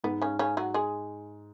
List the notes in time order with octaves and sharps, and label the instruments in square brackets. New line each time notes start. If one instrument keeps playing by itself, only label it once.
[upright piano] G#2 [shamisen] B3
[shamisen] C#3 C#4
C#3 C#4
F#3 F#4
G#3 G#4